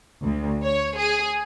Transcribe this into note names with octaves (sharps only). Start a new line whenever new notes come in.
D2
C#5
G#4